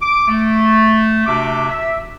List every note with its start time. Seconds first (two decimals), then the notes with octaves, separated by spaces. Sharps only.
0.01 D6
0.28 A3
1.26 C3 D4 F#4 E5 D6
1.69 E5